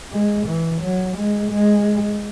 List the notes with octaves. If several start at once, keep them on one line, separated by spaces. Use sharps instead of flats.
G#3
E3
F#3
G#3
G#3